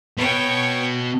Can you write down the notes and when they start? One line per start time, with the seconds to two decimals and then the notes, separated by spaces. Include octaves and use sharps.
0.18 B2 C#5 G5